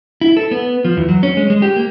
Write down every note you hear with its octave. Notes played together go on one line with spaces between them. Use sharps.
E4
A4
B3
F3
E2
F#3
C#4
G#3
G#3
G4
A#3